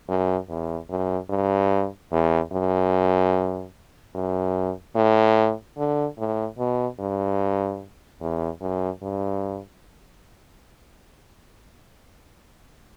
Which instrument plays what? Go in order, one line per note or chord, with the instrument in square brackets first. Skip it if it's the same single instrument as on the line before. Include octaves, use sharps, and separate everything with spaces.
[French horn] F#2
E2
F#2
G2
E2
F#2
F#2
A2
D3
A2
B2
G2
E2
F#2
G2